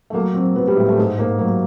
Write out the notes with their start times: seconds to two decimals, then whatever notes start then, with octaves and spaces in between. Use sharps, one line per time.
0.10 A3
0.13 F#3 A#3
0.34 F#3 C4
0.56 F#3 B3
0.67 G3
0.76 A2 G#3
0.89 A3
0.97 G#2 G#3
1.19 G#2 A#3
1.39 F#3 A#3